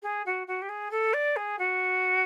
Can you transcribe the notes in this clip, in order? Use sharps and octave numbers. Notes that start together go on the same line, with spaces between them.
G#4
F#4
F#4
G4
G#4
A4
D5
G#4
F#4